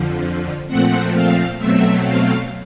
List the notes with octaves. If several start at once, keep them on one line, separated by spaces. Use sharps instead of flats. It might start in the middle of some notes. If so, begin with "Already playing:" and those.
Already playing: F2 D3 F3
A#2 F3 A3 C4 F#5
F5
B2 F#3 A3 C4 E5
F5